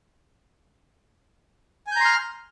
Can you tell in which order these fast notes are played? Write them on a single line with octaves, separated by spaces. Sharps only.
G#5 G6 A#5 C6 F6